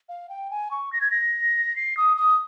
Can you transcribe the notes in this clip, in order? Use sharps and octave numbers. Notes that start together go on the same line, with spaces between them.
F5
G5
G#5
C#6
A#6
G#6
A#6
C7
D#6
D#6